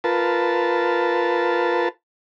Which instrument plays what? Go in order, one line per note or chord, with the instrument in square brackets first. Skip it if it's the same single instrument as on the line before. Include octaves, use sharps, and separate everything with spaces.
[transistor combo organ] F4 A#4 B4 A5